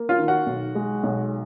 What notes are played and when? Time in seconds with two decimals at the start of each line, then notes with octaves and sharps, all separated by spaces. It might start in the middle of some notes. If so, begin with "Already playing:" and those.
Already playing: A#3
0.09 F4 F5
0.19 D#3
0.28 F#4 F#5
0.46 B1
0.75 G#3
1.03 B1